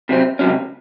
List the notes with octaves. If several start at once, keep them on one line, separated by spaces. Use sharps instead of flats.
C3 F#3 C4
C#2 C3 D#3 F#3 C#4